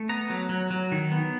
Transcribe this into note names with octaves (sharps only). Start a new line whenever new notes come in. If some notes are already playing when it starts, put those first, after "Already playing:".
Already playing: A3
B3 A#5
F#3
F#3
F#3
D#3
B3